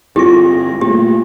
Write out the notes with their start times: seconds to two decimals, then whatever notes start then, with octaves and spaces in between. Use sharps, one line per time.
0.16 G1 G3 C4 E4 F4 G4 A#6
0.81 A#2 A3 A#3 G4